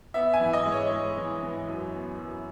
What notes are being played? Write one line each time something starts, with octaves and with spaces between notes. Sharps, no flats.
B3 E5
G#5
E3
D#5
G#3
C#5
G#3
E3
E3
F#2
B3
F#2